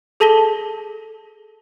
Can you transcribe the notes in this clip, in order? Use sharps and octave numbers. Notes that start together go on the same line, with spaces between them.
G#4 A4 A5 A#6 B6 G7